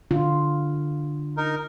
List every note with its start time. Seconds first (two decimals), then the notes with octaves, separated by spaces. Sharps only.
0.11 D3 F4
1.37 D#4 A#4